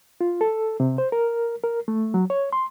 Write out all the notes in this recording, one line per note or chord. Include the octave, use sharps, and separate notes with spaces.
F4
A4
C3
C5
A#4
A#4
A3
F#3
C#5
C6